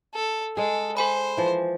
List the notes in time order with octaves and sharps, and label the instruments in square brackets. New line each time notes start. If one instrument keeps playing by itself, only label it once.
[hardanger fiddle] A4
[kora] G#3 G#4 [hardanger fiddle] A4
[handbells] A4 G#5 B5 [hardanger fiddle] C5
[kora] E3 F3